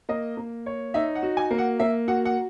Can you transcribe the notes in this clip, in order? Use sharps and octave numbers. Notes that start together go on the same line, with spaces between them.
A#3 D#5
A#3
C#5
D#4 E5
F#5
F#4
G#5
A#3
F#5
A#3 E5
F#4 F#5
F#5